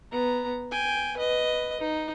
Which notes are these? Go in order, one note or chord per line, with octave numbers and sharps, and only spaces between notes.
B3 A#5
G5 G#5
B4 D#5
D#4